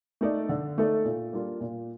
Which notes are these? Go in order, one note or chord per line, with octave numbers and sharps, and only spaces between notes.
A3 D#4 A4 D5
D3
A3 D#4 A4 D5
A#2
G3 A#3 D4 F4
A#2